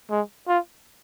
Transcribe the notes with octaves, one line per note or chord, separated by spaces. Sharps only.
G#3
F4